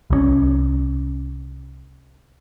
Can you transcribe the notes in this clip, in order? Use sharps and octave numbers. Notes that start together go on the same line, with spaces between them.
C2 F3 C#4